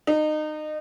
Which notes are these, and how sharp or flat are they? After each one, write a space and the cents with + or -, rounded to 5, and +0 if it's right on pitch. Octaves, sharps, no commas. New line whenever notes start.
D#4 -25